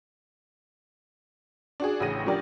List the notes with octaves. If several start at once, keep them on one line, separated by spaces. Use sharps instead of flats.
D4 F#4 G#4
A1 A2 C#3 A#6 D#7
F3 G3 D4 G4 A#4 D5